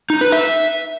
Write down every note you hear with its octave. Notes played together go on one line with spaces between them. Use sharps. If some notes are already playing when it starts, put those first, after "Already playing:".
D#4
B4
E5